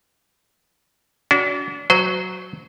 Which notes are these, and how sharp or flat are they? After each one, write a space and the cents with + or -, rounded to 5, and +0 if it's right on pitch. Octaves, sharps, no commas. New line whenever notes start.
D4 -40 F#4 +0
F#3 +0 C5 -30